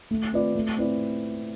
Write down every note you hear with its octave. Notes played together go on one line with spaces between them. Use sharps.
A3
C4 F4 B4 D5
A3
C4 E4 B4 D5